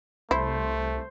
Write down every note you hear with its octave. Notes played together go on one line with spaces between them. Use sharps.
C2 A3 E4 C5